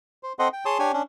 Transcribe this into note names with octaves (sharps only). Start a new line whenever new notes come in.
C5
C4 A4 C5 D#5 F#5 C6
G5
G#4 C#5 A5 C6 D#6
D4 G4 C#5 G#5
C#4 D4